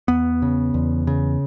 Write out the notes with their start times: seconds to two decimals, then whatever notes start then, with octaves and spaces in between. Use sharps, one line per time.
0.08 E2 B3
0.42 C#3
0.74 E2
1.07 C#3